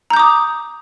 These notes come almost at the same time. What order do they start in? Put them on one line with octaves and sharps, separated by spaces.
A#5 G6 D6 D#6